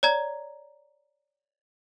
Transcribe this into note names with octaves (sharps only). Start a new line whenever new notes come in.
C#5 D5 A#5 G#6